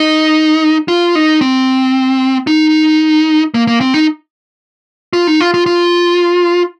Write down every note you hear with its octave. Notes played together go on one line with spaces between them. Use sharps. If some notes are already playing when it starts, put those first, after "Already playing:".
Already playing: D#4
F4
D#4
C4
D#4
A#3
A#3
C4
D#4
F4
D#4
F4
F4
F4